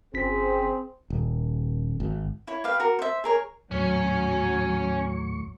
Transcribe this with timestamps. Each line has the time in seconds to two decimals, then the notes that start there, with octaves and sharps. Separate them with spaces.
0.14 G1 C4 C#4 G#4 B6
1.10 D#1
2.00 G#1
2.47 E4 C#5
2.64 G4 B4 F5
2.80 F#4 A#4
2.99 C5 E5
3.24 G#4 A#4 C#5
3.71 D#2 A2 F#3 C#4 C#5 C#6